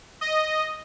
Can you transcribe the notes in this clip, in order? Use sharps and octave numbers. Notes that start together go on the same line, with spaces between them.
D#5